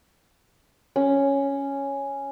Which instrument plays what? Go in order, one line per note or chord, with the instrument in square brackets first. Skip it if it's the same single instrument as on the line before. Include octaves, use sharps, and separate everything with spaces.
[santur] C#4